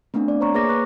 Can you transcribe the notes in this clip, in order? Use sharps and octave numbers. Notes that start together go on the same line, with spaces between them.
A3 B3 C4 D4
D5
C5 C#5 A#5 C#6
A#3 G#4 B4 C#5 D6 A#6
B4 C#6 F#6